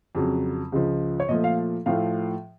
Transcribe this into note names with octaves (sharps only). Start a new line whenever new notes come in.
F2 C#3 F#3
C#2 C#3 F3
C#5
A#2 F3 A3 D#5
F5
A2 F3 A3 F5